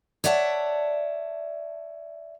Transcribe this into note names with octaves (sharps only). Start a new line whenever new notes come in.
C#5 D5 E5 F#5 G#5 A5